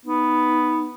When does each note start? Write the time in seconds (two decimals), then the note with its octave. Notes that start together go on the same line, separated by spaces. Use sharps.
0.06 B3 D#4